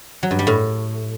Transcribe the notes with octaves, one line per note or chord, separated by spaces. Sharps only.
F#3
G2
G3
A2